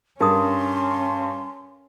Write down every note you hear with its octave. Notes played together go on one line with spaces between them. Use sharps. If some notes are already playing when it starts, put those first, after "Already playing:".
G2 C#4 G#4 A#4 C6 D#6